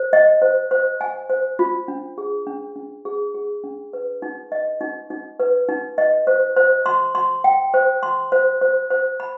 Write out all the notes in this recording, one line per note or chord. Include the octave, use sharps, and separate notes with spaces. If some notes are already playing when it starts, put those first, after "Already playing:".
Already playing: C5
D#5
C5
C5
G#5
C5
F4
D4
G#4
D4
D4
G#4
G#4
D4
B4
D#4
D#5
D#4
D#4
B4
D#4
D#5
C5
C5
C6
C6
G5
C5
C6
C5
C5
C5
B5